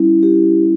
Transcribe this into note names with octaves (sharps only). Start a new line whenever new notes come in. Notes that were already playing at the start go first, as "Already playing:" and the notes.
Already playing: G3 C#4 E4
G4